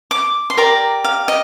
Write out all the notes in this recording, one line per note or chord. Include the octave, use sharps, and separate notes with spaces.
D6
C6
G4 A#4 D5 A#5
F5
D#5